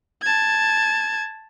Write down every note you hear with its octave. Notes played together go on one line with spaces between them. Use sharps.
A5 G#6